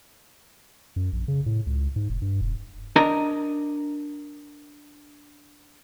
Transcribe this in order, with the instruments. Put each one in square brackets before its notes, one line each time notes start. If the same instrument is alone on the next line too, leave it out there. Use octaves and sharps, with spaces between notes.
[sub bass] F#2
A#1
C#3
A2
C#2
G#2
F1
G2
E1
[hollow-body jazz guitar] D4 A#4 D#5 A#5